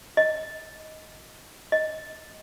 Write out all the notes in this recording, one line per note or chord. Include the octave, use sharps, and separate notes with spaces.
D#5
D#5